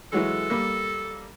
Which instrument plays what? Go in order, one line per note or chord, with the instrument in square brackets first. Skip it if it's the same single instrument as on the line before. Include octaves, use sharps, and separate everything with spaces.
[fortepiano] E3 F#3 G#3 [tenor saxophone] A4
[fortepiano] G3 A#3